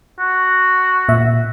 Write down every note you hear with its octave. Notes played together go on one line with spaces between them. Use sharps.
F#4
A#2 E5